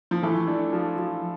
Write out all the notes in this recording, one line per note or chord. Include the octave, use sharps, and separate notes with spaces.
F3
E3 A3
D4
F3
F3